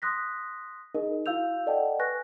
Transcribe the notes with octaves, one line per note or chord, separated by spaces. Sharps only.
C6 D#6 F#6 A#6 B6
D#4 G#4 A#4 D#5
E4 F#4 F5 E6 G6 F7
A4 D5 D#5 F#5 G5 A5
B4 G#5 C#6 F#6 A#6